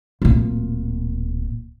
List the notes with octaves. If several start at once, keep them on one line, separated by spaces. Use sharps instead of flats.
D1 A#2